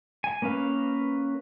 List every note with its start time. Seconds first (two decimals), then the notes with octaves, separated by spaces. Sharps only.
0.24 G#5
0.42 A#3 C#4 B4 F5